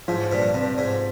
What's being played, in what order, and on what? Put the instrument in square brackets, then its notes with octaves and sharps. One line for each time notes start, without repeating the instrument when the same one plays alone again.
[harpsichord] G#2 [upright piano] F3
[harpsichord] G2 A#2
[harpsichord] G2 [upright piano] C3
[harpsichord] G#2